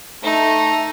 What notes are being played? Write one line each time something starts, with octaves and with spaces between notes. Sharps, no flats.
A3 D#4